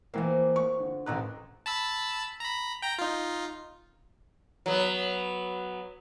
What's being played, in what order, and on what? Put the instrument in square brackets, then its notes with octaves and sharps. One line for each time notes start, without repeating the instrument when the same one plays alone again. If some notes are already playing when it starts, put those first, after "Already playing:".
[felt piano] E3 A#3 [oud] F3 C4
[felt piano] C#6
D3
[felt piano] A1 A#5 F#6 [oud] D3 D#3 B4
[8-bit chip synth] A5 B5 E6
A#5 B5
G5 A#5
D#4 F4
[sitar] F#3 B3